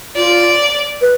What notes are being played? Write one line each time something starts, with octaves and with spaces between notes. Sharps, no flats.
F4 D5
B4